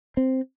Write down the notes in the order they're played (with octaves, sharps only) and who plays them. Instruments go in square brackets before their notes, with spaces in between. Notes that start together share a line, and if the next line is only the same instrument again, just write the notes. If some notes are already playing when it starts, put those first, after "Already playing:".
[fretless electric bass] C4